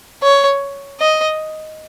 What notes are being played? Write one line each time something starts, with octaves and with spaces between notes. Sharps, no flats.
C#5
D#5